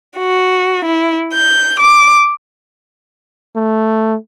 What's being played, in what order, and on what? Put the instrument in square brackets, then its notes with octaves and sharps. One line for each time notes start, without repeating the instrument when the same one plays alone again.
[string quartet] F#4
E4
G6
D6
[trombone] A3